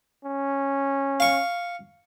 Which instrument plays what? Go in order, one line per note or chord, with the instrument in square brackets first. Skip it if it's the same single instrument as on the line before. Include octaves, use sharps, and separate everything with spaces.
[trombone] C#4
[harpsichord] F5 C#6